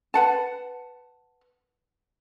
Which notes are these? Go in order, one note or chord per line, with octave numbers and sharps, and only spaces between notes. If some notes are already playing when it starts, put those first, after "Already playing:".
B4 F#5 A5